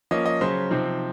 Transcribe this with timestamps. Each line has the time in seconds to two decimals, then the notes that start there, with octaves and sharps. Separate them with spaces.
0.11 F3 A#3 C#4 D#5
0.26 D#5
0.41 C#3 F#3 C#4 C5
0.71 C3 F3 C4 D#4